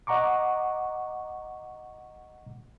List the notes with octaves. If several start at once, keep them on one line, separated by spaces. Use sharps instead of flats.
D#5 F#5 A#5 C#6 D6